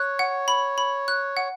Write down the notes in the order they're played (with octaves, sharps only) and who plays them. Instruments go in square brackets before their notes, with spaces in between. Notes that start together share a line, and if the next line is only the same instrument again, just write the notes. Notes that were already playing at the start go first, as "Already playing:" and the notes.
Already playing: [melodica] C#5 [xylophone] F#6
[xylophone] F#5
B5
B5
F#6
F#5